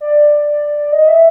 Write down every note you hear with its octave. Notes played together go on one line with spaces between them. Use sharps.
D5
D#5
E5